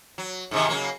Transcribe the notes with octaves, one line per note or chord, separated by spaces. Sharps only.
F#3
G#2 C3 D#3
C#3 F#3 A#3